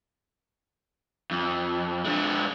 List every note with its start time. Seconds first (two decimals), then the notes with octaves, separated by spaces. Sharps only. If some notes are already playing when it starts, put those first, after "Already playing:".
1.31 F2
2.05 G#3 D4